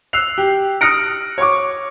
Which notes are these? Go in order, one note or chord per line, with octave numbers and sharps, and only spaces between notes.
E6 F#6 C7 F7
G4
D#6 F6 F#6 A#6 C#7 D7
C#5 C#6 D6